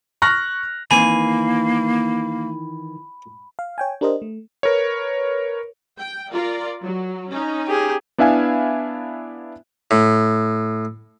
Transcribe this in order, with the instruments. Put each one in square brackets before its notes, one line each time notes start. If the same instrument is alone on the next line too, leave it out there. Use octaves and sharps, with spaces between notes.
[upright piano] C#6 F6 F#6 A#6
[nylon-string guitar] D#3 E3 C4 [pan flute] A#3 [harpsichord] G#5 [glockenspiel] B5
[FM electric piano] F5
C#5 G5 G#5
D4 G4 A#4 C5 D#5
A3
[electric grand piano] A#4 B4 C#5
[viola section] G5
F4 A#4 D5
F#3
C#4 D#4
[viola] G4 G#4
[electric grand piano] B3 D4 E4 E5 F5 G#5
[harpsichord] A2